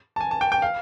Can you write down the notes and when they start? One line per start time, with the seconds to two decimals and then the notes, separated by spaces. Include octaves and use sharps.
0.16 A5
0.21 G#5
0.31 A5
0.41 G5
0.52 G5
0.62 F5